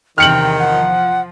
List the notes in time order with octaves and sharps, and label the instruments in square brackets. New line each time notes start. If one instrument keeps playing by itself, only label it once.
[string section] E2 C3 [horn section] D#3 [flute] G5 [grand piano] F6 C#7 F#7
[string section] F3 [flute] F#5